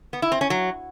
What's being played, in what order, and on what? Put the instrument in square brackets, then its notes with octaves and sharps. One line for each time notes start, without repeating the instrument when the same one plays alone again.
[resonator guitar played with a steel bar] B3
E4
C4
C#4
F#3